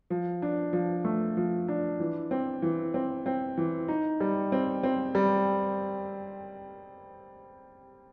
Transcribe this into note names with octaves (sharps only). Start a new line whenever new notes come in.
F3
D4
F3
A3
F3
D4
E3
C4
E3
C4
C4
E3
D#4
G3
C4
C4
G3